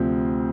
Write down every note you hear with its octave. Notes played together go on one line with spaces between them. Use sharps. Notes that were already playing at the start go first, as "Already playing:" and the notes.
Already playing: D2 C3 F3 C4